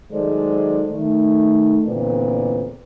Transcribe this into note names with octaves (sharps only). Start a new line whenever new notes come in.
D#3 F#3 G#3 A4 C5 D5
D#3 A3
E2 A#2 D3 C4 B4 D5